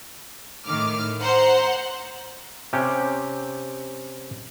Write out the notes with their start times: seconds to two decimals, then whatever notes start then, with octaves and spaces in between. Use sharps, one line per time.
0.65 A2 D#3 D6 F6
1.21 C5 F#5 A#5 C6
2.73 C3 C#4 G4